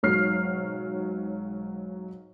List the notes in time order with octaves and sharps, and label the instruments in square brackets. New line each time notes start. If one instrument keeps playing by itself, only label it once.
[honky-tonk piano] B1 G#2 F#3 C#5 F6 C7